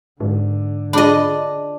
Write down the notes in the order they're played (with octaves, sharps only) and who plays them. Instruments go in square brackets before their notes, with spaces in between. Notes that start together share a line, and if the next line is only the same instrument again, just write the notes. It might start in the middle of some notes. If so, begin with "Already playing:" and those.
[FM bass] G#2 [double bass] D3
[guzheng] D4 D#5 [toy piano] F4 G#4 B5